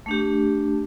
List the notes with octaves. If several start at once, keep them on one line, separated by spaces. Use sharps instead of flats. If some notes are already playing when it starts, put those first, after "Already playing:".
A3 D4 G4